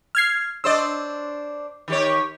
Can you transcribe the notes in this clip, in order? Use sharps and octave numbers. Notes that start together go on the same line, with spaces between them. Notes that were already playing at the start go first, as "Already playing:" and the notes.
F6 G#6 C7
D4 C5 D5 D#5 E6
D#3 G4 C#5